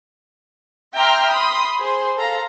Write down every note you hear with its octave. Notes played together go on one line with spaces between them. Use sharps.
E5 G5 A#5 C6 D6 F6
B5 C6 D#6
G#4 C5 C6
A4 F5 A#5